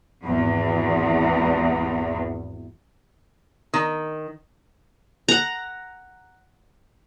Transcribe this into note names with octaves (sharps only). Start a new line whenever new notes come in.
G#1 E2
D#3
F#5 A#5